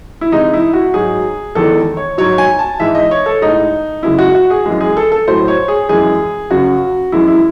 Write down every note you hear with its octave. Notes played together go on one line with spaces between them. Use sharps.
E4
C3 E3 G#3 D#4
E4
F#4
G#2 F#3 G#4
E2 D#3 G#3 A4
C#5
G#2 F#3 C#5
G#5
A5
G#2 E3 G#3 E5
D#5
C#5
A4
A2 G#3 D#4
F#2 C#3 G#3 E4
F#4
F#4
G#4
F#2 E3 G#3
G#4
A4
A4
A2 F#3 C5
C#5
G#4
F#2 E3 G#3 G#4
F#2 C#3 F#3 F#4
F#2 E3 G#3 E4
E4